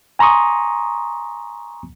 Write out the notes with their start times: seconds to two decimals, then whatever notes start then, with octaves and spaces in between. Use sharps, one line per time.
0.19 G#5 A#5 C6 C#6 D#6